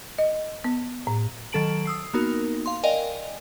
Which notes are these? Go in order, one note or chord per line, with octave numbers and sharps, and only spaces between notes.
D#5
B3
A2
D#3 F#3 A4 A5 D7 F#7
D#6 E6 C7
A#3 B3 D#4 F#4 A#4
F5 C6
A#4 D5 D#5 F5 G5 G#5